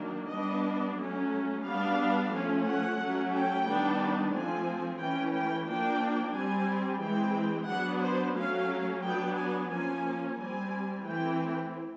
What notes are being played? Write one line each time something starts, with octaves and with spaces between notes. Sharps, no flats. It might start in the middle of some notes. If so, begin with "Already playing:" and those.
Already playing: D#3 F#3 A#3 D4
G3 B3 D4 D#5
F#3 A3 C#4
G3 B3 D4 F5
F3 A3 C#4
F#5
F#3 A3 C#4
G5
D#3 G3 B3 D4
F3 A3 C4 G#5
E3 A3 C#4 G5
G5
F3 A#3 D4 G5
G3 C4 G#5
E3 G#3 C4 G5
F#3 B3 D4 F#5
C5
F#3 A3 C#4 F5
F#3 B3 D4 G5
G#5
F3 A#3 C#4 G#5
G3 C4 G#5
E3 A3 C4 G5